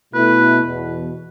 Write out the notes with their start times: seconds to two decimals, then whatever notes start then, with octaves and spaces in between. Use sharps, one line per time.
0.14 B2 A3 E4 B4
0.63 E2 B2